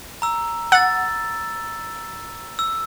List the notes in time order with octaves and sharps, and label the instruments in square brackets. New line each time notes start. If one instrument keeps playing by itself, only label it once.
[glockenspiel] A#5 E6
[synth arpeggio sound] F#5 [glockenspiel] E6 A6
[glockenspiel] E6